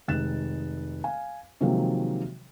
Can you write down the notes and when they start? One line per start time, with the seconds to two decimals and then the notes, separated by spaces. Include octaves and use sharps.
0.08 F1 D#3 G#3 F#6 A6 E7
1.04 F5 G#5
1.61 C3 D#3 F3 F#3 G#3 A#3